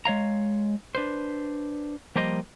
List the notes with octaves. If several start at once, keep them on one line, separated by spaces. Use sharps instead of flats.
G#3 C#5 F5 A#5
D4 B4 C5
F3 G3 A#3 G4 C5 D#5